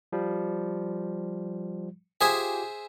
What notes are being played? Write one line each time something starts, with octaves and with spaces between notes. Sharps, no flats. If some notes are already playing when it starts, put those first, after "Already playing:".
F3 G3
F4 G4 G#4 C5 E5 G#5 D#6 G#6